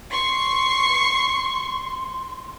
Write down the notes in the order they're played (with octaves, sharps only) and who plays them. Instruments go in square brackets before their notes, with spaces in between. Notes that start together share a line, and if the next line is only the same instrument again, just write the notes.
[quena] C6 [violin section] C#6 C7